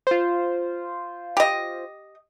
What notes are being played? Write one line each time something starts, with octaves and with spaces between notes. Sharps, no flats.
F4 C5
G4 D#5